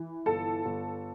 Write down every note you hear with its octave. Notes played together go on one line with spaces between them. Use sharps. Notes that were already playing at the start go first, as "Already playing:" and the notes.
Already playing: E3
G1 A4
G1